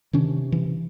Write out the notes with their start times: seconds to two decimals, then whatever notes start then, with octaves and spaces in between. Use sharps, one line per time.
0.13 C3 D#3 C#4 D4
0.52 E3